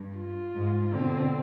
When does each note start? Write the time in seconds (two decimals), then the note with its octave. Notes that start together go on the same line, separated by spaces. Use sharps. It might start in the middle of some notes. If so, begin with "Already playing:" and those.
Already playing: G2
0.18 F4
0.57 G#2
0.94 B2 D3 C4